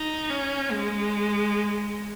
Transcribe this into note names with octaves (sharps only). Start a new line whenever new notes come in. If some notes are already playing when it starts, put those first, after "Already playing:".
Already playing: D#4
C#4
G#3